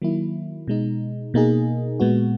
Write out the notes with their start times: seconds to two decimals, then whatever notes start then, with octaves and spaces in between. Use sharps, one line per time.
0.02 D#3 F#3 A#3 E4
0.68 B2 G#3 D#4
1.34 B2 A#3 D#4 G#4
2.00 A#2 G#3 B3 F#4